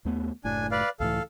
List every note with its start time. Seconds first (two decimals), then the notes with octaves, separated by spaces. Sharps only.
0.05 D#2 A3 B3
0.44 F#1 A2 D4 G#5
0.71 B4 D5 F5
1.00 C#2 A2 E3 A4 F5